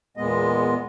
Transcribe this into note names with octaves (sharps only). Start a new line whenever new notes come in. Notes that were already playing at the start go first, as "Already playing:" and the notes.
E2 A#2 G#3 B3 D#5